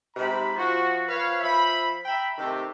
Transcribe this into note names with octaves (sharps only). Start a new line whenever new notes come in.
G#2 C3 B5
F3 F#4
F3 B4 C#5 F5
F3 E5 B5
E5 G5 A#5 B5
C3 D#3 A3 C4 G4